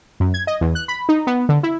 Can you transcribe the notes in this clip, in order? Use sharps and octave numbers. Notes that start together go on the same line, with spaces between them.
F#2
G#6
D#5
E2
F#6
B5
D#4
B3
D3
E4